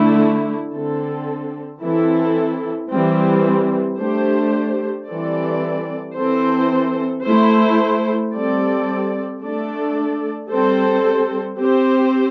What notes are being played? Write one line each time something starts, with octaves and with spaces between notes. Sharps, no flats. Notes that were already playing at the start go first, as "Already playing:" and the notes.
Already playing: D3 A3 E4
D3 C4 A4
E3 C4 E4 A4
E3 G3 C4
A3 D4 G4 C5
E3 G3 C4 A4 D5
E3 C4 A4 C5
A3 E4 C5
G3 C4 A4 D5
A3 D4 A4 D5
G3 C4 A4 C5
C4 G4 C5